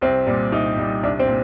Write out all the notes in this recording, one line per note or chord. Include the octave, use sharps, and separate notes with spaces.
C2 C4
A#2 G3
C2 D#4
A#2 G3
C2 D4
C4
A#2